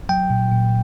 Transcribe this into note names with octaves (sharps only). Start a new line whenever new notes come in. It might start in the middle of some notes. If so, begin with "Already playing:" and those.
F#3 G5
A#2
A#2